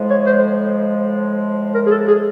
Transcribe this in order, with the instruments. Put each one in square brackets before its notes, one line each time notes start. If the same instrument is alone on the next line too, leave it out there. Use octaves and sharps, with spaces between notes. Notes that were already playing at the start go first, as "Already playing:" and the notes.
Already playing: [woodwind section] A2 F3 G#3
[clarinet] C#5
C5
A#4
G#4
A4
G#4